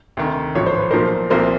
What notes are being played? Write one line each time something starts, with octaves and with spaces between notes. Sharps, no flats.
D2 C3 D#3
A1 G#2 F3 C#5
C5
B4
B1 A#2 F3 A#4 C5
C2 A#2 F3 A#4 C5